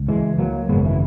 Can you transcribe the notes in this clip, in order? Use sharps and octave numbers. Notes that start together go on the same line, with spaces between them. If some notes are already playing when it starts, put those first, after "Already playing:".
Already playing: C#2
E3 G#3
F#3 A#3
G#1 F#2 C#3 G#3 B3
E3